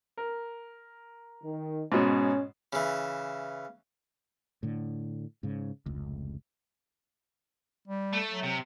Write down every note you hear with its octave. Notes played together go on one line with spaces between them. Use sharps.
A#4
D#3
G#2 B2 C#4
C#3 E3
A2 D3
G#2 C#3
F1 C#2
G3
A3
F#3
C3